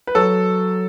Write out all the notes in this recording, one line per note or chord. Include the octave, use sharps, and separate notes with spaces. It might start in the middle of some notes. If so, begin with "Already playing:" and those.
B4
F#3 A4